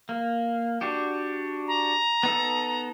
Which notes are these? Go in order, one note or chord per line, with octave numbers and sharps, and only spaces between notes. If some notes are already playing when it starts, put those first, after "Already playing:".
A#3
D4 F#4 G4
A#5
B3 D#4 A4